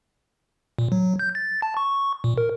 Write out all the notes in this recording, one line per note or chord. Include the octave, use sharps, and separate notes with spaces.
A#2
F#3
G6
A6
A5
C#6
A#2
A#4